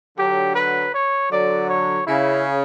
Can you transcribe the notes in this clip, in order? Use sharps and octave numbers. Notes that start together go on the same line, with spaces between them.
D3 F#3 G4
B4
C#5
D3 F#3 D5
C#5
C#3 E4